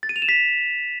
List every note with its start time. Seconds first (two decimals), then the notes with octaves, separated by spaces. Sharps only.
0.03 A6
0.09 D#7
0.16 F7
0.22 E7
0.29 B6